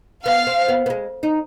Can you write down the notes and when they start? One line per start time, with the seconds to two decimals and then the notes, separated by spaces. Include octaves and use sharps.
0.25 B3 F5
0.47 C4
0.68 B3
0.86 B3
0.90 G#3
1.23 D#4